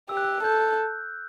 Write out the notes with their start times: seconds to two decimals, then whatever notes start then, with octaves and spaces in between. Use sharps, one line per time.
0.09 G4 E6
0.17 F#6
0.24 E6
0.43 A4 G6